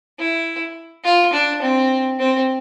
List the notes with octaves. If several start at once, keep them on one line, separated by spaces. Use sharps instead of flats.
E4
F4
D4
C4
C4